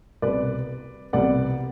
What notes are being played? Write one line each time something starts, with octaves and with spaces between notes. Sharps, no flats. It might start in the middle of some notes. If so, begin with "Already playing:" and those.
C2 B2 G3 B3 B4 D5
C2 B2 G3 B3 D5 F#5